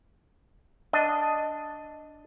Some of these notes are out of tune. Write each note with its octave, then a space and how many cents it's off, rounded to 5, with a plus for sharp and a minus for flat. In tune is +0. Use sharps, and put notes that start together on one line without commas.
D4 +0 D#5 +0